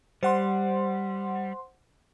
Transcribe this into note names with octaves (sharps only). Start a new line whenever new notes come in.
G3 C5 F#5 C6